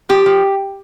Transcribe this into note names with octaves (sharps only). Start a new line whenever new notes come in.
F3 G4
F3